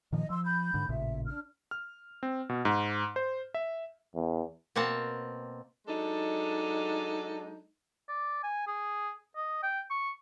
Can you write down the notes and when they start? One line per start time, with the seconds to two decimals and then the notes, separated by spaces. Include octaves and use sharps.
0.12 A#2 D#3 F3 D#5
0.30 F3 C6 E6
0.44 B5 G6
0.74 G#2 D3
0.89 A1 A#2 C#3 E5
1.26 D4 F6
1.71 F6
2.23 C4
2.49 B2
2.65 G#2
3.16 C5
3.54 E5
4.15 E2
4.76 B2 A#3 C4 F#5 A5
5.87 F#3 G#3 D4 D#4 A4
8.09 D5
8.43 G#5
8.67 G#4
9.36 D#5
9.63 G5
9.90 C#6